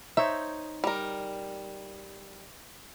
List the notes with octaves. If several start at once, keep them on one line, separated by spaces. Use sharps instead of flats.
D#4 C5 C#5 E5
G3 A#4